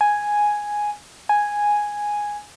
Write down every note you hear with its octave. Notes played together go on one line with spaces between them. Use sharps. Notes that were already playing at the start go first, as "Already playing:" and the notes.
G#5
G#5